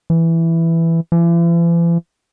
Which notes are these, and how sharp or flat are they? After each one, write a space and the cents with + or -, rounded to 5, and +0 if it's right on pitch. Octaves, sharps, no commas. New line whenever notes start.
E3 +5
E3 +45